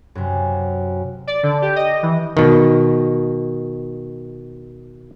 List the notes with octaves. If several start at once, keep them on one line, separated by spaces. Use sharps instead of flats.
F#2 C3
D5
D3
G4
D#5
E3
B2 D#3